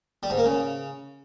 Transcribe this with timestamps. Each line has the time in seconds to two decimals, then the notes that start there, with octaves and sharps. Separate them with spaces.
0.23 G3
0.30 G#2
0.37 A#3
0.45 C#3